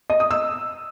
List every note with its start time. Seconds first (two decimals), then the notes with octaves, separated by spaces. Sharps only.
0.10 D#5
0.20 D#6
0.31 E6